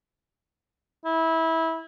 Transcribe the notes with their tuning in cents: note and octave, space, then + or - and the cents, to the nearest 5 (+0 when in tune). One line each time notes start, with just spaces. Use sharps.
E4 -20